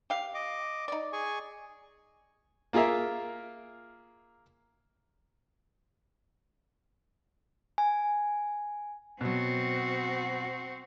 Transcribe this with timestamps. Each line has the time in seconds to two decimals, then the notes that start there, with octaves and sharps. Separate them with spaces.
0.10 G4 F5
0.34 D#5 D6
0.88 D#4 D5
1.13 G#4 G#5 C#6
2.73 A#3 F4 G#4 A#4 E5
7.78 G#5
9.21 B2 F#3 C4 F#4